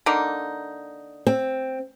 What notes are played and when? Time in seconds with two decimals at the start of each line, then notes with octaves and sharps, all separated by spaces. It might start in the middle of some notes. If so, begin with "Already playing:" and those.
0.06 D3 A#3 D#4
1.27 C4